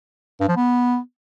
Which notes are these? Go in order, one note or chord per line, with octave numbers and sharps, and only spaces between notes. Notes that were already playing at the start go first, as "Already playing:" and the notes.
G2
F3
B3